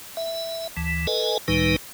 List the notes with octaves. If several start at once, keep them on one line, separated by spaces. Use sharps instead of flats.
E5
D2 E3
A4 B4 D#5 G#5
C#2 A2 D#3 G3 D#4 B4